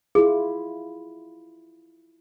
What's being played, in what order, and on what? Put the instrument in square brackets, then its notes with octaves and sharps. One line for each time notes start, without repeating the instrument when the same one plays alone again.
[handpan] E4 F4 [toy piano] G#4